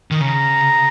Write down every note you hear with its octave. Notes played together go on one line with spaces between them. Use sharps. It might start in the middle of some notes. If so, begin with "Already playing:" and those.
D#3
C#3 A#5